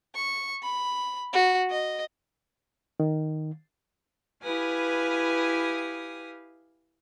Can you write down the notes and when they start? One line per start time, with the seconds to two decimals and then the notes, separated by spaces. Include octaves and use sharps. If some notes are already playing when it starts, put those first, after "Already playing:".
0.15 C#6
0.62 B5
1.33 F#4
1.70 D#5
3.00 D#3
4.43 E4 G4 B4 F5 G#5 D#6